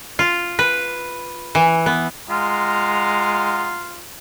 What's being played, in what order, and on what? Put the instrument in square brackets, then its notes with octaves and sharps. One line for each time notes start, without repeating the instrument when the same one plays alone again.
[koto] F4
B4
E3
B3
[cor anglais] G#3 [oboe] F4 [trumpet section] F5 F#5 A#5